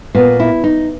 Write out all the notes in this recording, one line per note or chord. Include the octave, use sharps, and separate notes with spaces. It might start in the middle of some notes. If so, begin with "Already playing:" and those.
A#2 B3
E4
D#4